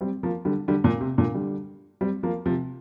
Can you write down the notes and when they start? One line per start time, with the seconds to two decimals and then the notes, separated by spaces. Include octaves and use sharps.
0.01 G3 C4
0.23 F3 A#3
0.45 D3 G3
0.68 D3 G3
0.84 A#2
1.01 C3
1.18 A#2 D3
1.34 D3 G3
2.01 G3 C4
2.23 F3 A#3
2.46 C3 F3